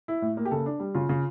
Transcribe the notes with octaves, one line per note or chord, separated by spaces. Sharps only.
E4
A2
A#3
G4
C#3 A4
D4
G3
C#3 F4
C#3